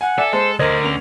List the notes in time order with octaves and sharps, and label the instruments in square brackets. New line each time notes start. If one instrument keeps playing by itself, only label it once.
[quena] F#5 [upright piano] G#5
[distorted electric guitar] A4 [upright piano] D5 E5 G#5
[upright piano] G#3 [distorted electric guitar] A4 [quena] C5
[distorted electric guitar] D2 D3 [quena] A#4 [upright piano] C5 D#5 G#6
[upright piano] B3 C#4 F7